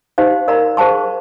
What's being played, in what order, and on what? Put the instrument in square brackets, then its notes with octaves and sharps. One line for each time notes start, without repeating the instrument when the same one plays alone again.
[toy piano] D#4 G4 C5 F5
A#4 D5 F5 A#5
G#4 C5 F5 A5 C#6